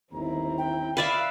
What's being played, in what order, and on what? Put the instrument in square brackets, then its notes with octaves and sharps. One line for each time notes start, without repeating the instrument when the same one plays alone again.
[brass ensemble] G1 D#2 A#5 [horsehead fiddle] C4 E4
[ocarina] G5
[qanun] B4 D5 E5 [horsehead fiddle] F5 [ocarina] B5